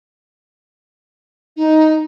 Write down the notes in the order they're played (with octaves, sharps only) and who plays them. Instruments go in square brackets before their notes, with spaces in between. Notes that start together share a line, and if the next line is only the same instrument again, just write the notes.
[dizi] D#4